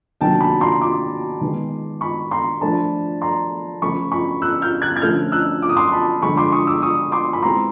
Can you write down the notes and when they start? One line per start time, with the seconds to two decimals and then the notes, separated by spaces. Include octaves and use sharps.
0.21 C3 D#3 F#3 A#3 D4 G5 A5
0.41 A5 B5
0.61 A#5 C6
0.81 C6 D6
1.41 D#3 G#3 B3
2.01 B5 C#6
2.31 A#5 C6
2.61 F3 A3 D4 A5 B5
3.22 A#5 C6
3.82 C#3 F3 A3 B5 C#6
4.12 B5 C#6
4.42 E6 F#6
4.62 F6 G6
4.82 F#6 G#6
4.96 G#6
5.02 D3 F3 A3 C#4 F6 G6
5.32 E6 F#6
5.62 D6
5.69 D#6
5.76 C6 D6
5.92 A5 B5
6.22 D3 F3 G#3 B5 C#6
6.37 C6 D6
6.52 C#6 D#6
6.67 D6 E6
6.82 C#6 D#6
7.12 C6 D6
7.33 B5
7.42 E3 G#3 C4 A#5 C6